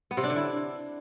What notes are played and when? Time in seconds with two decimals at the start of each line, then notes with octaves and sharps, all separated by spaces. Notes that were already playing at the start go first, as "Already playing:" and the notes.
0.11 B3
0.17 C3
0.23 D4
0.30 D3
0.36 E4